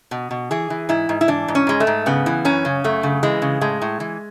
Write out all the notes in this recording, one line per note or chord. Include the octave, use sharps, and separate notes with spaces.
B2
B2
E3 G#4
E3
G#2 E4
G#2
E4
E3 D4
G#2
C#4
G#2 G#3
A3
G#2
C#3 B3
E3
F#2 C#4
C#3
F#2 A3
C#3
E3 G#3
C#3
A2 G#3
A2
E3